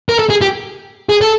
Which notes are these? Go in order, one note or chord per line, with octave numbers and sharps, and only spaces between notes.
A#4
A4
G#4
G4
G#4
A4